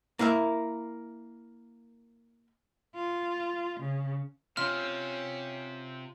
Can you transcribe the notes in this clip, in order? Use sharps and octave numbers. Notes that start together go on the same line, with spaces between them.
A#3 E4 A#4 E5
F4
C#3
C3 C#4 F4 F6